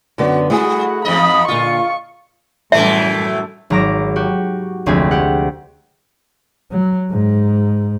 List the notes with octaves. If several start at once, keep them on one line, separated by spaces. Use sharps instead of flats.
F#2 D3 B3 F#4
G3 A3 E4 F#4 G#4
E2 G#2 D#5 B5
A#2 D3 F4 C#6
F#2 A2 E3 G3 A3 E5
G#1 F#3 A#5 D6 A#6
F#4 G4
F1 D2 G#3 C4 G#5 B6
G4 F#5
F#3
G#2